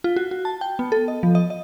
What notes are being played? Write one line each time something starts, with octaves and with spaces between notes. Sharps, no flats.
F4
F#4
F#4
A5
G5
B3
A4
D#5
F3
D#5
D#5